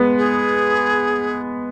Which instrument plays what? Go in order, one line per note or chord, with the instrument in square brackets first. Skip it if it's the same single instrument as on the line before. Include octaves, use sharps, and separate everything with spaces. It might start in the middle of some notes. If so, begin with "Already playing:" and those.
Already playing: [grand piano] G#3 B3
[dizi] G#4